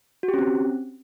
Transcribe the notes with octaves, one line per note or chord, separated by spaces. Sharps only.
F#4
G4
C#4
C4